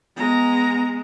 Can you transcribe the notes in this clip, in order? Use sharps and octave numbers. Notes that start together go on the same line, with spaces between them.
G#3 B3 A#5